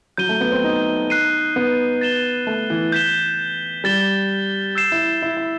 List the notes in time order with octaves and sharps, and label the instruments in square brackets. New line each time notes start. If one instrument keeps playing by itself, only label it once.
[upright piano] F#3 [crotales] G6 D#7 G7
[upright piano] A3
B3
C4
D#4
[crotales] F#6 C7 D#7
[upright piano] B3
[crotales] A6 E7 G7
[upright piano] A3
E3
[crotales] G6 B6 E7 G7
[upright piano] G3 [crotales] A6 E7 G7
[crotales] E6 G6 C7 E7
[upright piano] E4
E4
E4